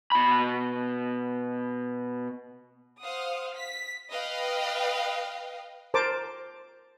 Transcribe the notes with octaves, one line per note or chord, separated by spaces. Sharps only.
B2 B5
C5 F5 F#5 D#6
B6
B4 D#5 F5 G5
A#4 C5 A5 D6